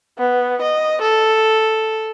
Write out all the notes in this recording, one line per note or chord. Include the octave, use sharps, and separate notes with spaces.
B3
D#5
A4